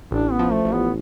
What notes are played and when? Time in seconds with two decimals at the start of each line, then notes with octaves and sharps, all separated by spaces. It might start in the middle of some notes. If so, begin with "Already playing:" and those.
0.11 A1 D4
0.31 B3
0.39 F3
0.52 A3
0.65 A1
0.73 B3